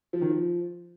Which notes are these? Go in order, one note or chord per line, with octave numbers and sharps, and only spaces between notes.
F3
D#3
F3